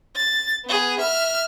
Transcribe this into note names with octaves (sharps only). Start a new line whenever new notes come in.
A6
B3 G#4
E5 F6